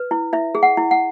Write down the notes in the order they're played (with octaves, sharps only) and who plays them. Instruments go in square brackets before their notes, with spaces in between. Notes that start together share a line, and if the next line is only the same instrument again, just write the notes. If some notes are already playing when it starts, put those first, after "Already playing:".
Already playing: [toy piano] B4
E4
E4 E5
G#4
F#5
E4
F#5